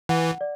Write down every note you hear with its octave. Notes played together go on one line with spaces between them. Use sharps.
E3 F#5
D5